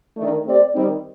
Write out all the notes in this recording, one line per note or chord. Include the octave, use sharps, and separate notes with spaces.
D#3 A3 D4
A3 C4 G4 D5
D#3 G3 C4 D#4